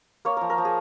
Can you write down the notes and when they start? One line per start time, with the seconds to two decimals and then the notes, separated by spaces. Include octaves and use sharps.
0.25 A#3 C#5
0.37 F3 A#4
0.50 A#4
0.58 F3
0.65 G#4